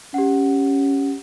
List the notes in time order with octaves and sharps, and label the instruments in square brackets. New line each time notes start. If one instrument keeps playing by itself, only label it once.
[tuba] C#4 [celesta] G4 F#5